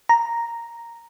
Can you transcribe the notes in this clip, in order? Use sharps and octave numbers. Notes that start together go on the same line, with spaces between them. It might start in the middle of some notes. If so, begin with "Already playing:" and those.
A#5